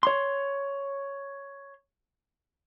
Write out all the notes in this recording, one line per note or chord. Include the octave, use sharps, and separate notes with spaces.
C#5 C6